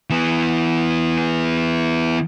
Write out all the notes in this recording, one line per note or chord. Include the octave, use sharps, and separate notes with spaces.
E3 B3